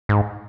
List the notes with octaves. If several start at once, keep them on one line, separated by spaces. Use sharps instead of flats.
G#2